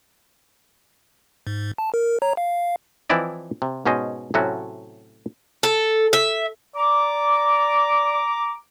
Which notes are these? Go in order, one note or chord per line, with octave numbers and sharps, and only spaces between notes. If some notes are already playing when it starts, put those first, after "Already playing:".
G#2
A5
A#4
C#5 A#5
F5
E3 F3 C4 E4 D5 D#5
C3
G#2 B2 C#4 C5 D#5
A2 C3 F#3 A3 C#4 F#4
A4
E5
D5 A#5 D6